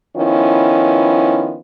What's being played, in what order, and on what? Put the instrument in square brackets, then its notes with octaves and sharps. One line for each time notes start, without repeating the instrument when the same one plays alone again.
[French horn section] D#3 F3 B3 C#4 E4